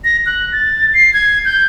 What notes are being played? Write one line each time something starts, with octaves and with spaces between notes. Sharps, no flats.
A#6
F#6
A6
C7
G#6
G6